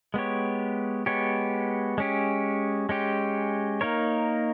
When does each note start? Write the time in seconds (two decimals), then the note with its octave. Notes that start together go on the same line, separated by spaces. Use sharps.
0.14 G#3 B3 G4 C#5
1.06 G#3 B3 G4 C#5
1.98 G#3 C#4 G4
2.89 G#3 C#4 G4
3.81 A#3 D#4 A#4 C#5